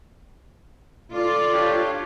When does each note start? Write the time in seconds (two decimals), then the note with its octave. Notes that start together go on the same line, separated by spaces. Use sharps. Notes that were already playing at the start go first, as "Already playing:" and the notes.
1.13 F4 A4 D5
1.53 D4 G4 C#5